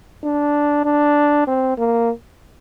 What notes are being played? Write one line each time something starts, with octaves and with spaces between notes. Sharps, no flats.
D4
D4
C4
A#3